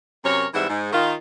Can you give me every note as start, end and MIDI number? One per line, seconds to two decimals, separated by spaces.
0.25 0.46 42
0.25 0.46 48
0.25 0.46 70
0.25 0.46 73
0.54 0.68 44
0.54 0.68 52
0.54 0.68 55
0.54 0.68 60
0.54 0.68 76
0.54 0.68 78
0.70 0.91 44
0.92 1.13 51
0.92 1.13 65